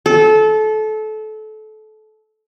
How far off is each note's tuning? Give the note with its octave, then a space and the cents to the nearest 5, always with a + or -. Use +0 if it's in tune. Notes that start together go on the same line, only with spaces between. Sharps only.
A4 -25